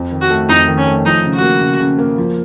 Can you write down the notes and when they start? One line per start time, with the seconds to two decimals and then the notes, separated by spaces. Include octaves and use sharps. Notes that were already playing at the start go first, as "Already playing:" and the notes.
Already playing: F2
0.12 D#3
0.21 F#4
0.30 A3
0.49 F2 D#4
0.68 D#3
0.77 C#4
0.87 A3
1.05 F3 D#4
1.24 C#3
1.34 F#4
1.42 A#3
1.61 C#3
1.80 C#3
1.99 A#3
2.18 F3